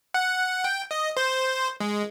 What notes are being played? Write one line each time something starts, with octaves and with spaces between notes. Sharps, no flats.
F#5
G5
D#5
C5
G#3